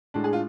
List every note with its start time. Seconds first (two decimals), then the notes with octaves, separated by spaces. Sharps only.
0.14 A2 G#3 D4
0.24 G#4
0.33 F4